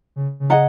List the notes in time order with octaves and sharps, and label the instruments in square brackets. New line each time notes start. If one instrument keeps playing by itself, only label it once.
[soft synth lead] C#3
C#3
[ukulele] G#4 D#5 F#5 A#5